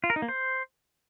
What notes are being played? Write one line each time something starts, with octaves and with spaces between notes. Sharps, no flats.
F4
A#4
D#4
A#3
C5